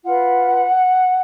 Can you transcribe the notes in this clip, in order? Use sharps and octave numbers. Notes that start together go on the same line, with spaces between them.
F4 B4 F#5